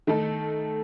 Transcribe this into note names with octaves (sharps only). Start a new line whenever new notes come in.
D#3 A3 D#4 A4